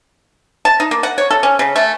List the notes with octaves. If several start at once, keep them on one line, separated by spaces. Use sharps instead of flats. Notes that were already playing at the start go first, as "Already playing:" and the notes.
A5
D#4
A#3
F#5
C#5
A4
C#4
C#3
A3